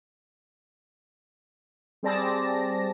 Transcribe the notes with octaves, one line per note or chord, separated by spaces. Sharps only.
G3 C4 G#4 D5 A5 A#6